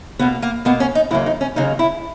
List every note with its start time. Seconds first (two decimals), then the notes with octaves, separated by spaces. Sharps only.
0.19 B2 A#3 B3
0.42 A#3
0.65 B2 A#3 B3
0.80 C#4
0.95 D#4
1.10 D#2 C#3 F#3 A#3 E4
1.26 D#4
1.41 C#4
1.56 D#2 C#3 F#3 A#3 D#4
1.79 E4